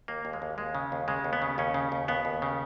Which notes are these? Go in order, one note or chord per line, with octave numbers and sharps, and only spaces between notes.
D#2 A#3
D#2
G#3
D#2
D#2 G#3
C#3
D#2
C#3 G#3
D#2
B3
C#3
D#2 C#4
C#3
D#2
D#2 B3
D#2
C#3